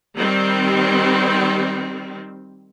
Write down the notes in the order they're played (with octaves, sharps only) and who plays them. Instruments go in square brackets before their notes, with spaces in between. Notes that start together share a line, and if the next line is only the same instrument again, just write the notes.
[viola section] D#3 G3 C4